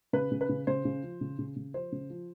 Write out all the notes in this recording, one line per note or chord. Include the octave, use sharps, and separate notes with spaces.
C#3 B4
C#3
B4
C#3
C#3 C5
C#3
F3
C#3
C#3
C#3
F3 C5
C#3
F3